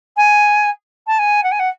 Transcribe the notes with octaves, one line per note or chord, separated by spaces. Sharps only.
G#5
A5
G#5
F#5
G#5
F#5